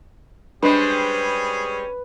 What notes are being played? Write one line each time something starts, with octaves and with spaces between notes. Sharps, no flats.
G3 G#3 C#4 D4 G#4 B4 C5